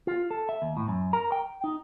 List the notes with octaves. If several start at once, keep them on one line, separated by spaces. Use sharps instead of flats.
F4
A4
E5
D#2
A2
F#2
A#4
G5
D#4